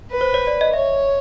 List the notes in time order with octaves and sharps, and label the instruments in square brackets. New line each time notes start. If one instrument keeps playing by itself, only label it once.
[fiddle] B4
[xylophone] C5
C#5
D5
D#5
[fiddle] C#5 [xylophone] E5